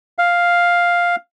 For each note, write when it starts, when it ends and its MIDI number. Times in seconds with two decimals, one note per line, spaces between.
0.18 1.16 77